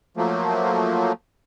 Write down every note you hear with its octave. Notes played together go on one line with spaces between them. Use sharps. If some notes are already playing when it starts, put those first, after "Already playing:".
F3 F#3 A3 A#3